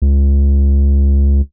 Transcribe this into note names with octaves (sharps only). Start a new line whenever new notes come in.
C#2